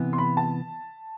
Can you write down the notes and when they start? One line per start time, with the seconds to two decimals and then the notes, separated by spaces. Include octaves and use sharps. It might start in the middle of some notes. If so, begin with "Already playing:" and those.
Already playing: C3 E3 B3
0.13 C6
0.18 B5
0.37 A5